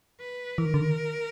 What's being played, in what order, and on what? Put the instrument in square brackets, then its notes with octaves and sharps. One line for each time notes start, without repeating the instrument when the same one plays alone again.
[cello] B4
[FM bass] E3 [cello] A#4
[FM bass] D#3
D3
D#3